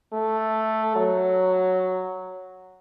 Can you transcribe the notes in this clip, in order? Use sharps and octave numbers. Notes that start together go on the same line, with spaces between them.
A3
F#3